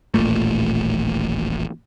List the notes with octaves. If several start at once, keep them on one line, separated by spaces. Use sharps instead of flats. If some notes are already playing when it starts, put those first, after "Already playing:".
D#1 A1 A#2 A3